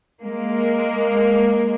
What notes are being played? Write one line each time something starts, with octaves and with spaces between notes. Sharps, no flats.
G#3 A#3